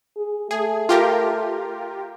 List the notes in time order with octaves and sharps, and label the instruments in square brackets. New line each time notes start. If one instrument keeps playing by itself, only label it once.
[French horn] G#4
[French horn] A3 [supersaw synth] G#4
[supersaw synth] F4 G4 A#4